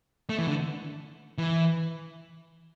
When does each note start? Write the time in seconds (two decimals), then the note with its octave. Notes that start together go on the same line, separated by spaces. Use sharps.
0.29 A3
0.39 E3
0.48 D3
1.38 E3